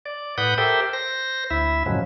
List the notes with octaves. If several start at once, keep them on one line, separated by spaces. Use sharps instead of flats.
D5
A2 B4 F#5 D#6 G6
G4 A4 A#4 C5 E5 G5
C5 A#6
D2 E4 E5
F#2 A2 C#3 F3 F#3 G#3